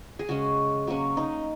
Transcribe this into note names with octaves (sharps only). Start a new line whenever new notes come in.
G#4
C#3 G#3 C#4 F#4
F#3 A#3 C#4
D#4